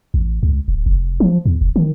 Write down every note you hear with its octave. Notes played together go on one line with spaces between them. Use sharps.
A1
C#2
D1
F1
F3
E2
E1
D#3